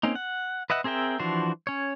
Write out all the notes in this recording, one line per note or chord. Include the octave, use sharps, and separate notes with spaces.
A#3 C4 C#4 D#4
F#5
B4 D#5 E5 F#5
C4 G#4 A#4 E5 G5
E3 F3 D4 F#4 C5
C#4 C#5